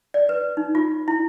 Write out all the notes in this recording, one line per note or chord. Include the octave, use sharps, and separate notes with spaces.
D5
B4
D#4
F4
E4